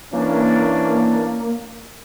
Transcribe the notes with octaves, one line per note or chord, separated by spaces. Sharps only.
E3 A#3 C#4 D4